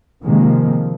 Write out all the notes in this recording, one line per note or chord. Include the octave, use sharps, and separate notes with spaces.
C3 D#3 F3 G#3 A#3